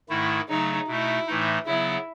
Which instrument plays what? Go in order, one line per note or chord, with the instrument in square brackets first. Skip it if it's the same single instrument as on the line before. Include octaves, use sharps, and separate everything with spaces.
[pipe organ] G#2 D#3 A3 E4
[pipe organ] C#3 F#3 A3 [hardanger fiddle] D#4
[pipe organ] B2 A3 D#4 [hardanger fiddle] E4
[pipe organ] A2 E3 A3 D#4
[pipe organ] C#3 F#3 B3 [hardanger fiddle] E4